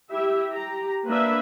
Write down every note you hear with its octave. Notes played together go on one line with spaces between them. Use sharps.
E4 G4 E5
G4 A#5
A#3 D4 B4 E5